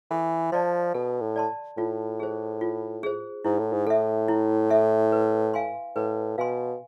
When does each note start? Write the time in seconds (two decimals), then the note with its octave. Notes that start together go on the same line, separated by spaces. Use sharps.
0.11 E3 A4
0.52 F3 D5 A5 C6
0.94 B2 A4
1.21 A2
1.36 D5 A5 C6
1.77 A2 F4
2.20 G#4 C5
2.61 F4
3.03 G#4 C5
3.45 G#2 E4
3.59 A2
3.73 G#2
3.86 A2 A4 E5
4.28 E4
4.70 A4 E5
5.12 B4
5.54 F5 G#5 C6
5.96 A2 B4
6.38 B2 F5 G#5 C6